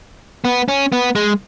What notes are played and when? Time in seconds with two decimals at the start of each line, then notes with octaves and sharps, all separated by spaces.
0.45 B3
0.68 C#4
0.92 B3
1.15 G#3